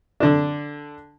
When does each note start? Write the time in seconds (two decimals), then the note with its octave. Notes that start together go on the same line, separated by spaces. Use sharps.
0.20 D3 D4